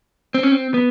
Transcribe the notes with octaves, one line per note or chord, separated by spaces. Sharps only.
C4
C#4
C4
B3